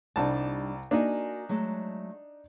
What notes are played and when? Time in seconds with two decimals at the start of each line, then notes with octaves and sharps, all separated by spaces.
0.16 C2 G3 D4 D#4 A5
0.91 A#3 D4 D#4 F#4 G#5
1.49 F#3 G#3 A3